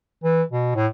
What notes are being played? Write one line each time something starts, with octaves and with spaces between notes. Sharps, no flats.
E3
B2
A2